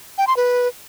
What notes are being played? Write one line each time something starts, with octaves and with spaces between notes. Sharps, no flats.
G5
C6
B4